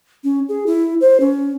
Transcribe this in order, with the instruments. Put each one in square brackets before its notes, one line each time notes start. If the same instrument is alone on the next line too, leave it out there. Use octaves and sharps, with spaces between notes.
[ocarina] C#4
G#4
E4
C5
C#4